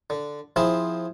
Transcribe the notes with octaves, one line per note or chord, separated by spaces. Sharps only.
D3
F3 C4 E4 G#4 E5